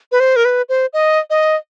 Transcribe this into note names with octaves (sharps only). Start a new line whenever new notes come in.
B4
C5
A#4
B4
C5
D#5
D#5